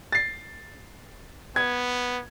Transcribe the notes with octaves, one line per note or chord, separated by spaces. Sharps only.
A6 C7
B3 G#6